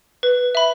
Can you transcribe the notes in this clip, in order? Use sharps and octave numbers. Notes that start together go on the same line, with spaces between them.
B4
E5 B5